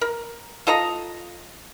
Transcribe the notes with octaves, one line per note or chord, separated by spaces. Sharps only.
A#4
F4 A4 D#5 A#5